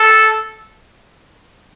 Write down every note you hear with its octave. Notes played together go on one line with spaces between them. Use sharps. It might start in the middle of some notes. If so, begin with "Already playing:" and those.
Already playing: A4